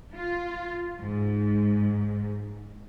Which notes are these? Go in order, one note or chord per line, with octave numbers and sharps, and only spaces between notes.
F4
G#2